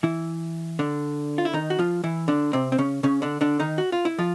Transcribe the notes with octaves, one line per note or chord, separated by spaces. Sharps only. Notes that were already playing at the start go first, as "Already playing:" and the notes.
E3 E4
D3 D4
F4
E4
D#3 D#4
F#4
F3 F4
E3 E4
D3 D4
C3 C4
C4
C#3 C#4
C#3 C#4
D3 D4
D3 D4
D#3 D#4
F#4
F4
E4
F3 F4